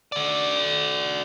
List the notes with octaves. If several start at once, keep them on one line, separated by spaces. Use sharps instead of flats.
F#4 D5